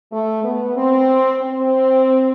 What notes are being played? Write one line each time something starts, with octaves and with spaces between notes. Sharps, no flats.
A3
B3
C4
C4